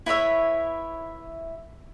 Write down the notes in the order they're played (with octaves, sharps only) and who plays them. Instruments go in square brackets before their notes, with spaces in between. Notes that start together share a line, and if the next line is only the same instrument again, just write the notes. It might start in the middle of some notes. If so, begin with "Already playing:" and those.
[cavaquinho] E4 B4 C#5 E5